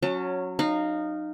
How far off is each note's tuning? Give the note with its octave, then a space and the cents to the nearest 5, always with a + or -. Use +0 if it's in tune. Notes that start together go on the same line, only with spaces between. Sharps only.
F#3 -10 C#4 +0 A5 +35
D#4 -20 F5 +0